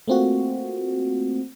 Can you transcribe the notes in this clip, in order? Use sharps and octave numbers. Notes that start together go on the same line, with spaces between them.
A3 A#3 C4 F4 F#4